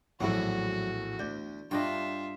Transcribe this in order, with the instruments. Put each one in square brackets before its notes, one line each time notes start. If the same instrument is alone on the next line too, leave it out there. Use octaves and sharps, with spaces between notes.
[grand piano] A#1 A2 [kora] E3 B3 E4 [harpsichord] F#3 [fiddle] F#4
[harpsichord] D2 [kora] D5 [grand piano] G6
[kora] G2 D4 D#5 [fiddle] F4 E5 [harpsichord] G5